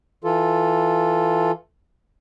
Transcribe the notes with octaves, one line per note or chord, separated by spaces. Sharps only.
E3 F4 A4